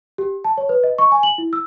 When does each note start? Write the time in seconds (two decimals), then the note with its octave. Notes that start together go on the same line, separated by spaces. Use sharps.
0.18 G4
0.44 A5
0.58 C#5
0.69 B4
0.84 D#5
0.98 C#6
1.12 G#5
1.23 F#7
1.38 E4
1.53 E6